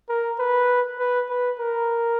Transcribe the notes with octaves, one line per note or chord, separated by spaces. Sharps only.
A#4
B4
B4
B4
A#4